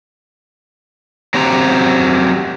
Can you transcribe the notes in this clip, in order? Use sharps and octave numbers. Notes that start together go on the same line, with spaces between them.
F#3 C4 G4 A#5